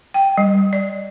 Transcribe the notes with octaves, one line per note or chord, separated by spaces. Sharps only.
G5
G3
D5